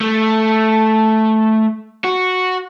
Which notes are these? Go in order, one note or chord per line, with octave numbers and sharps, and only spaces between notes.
A3
F#4